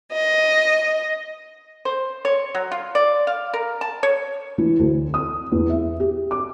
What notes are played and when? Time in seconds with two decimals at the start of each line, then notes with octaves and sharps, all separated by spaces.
0.11 D#5
1.85 C5
2.25 C#5
2.55 F#3
2.71 F4
2.95 D5
3.27 F5
3.54 A#4
3.81 A5
4.03 C#5
4.58 E3
4.79 D2
5.14 D#6
5.52 E2
5.70 E5
6.00 G4
6.31 D6